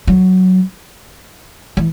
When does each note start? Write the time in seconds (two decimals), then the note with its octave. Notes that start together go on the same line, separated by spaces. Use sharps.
0.07 F#3
1.77 E3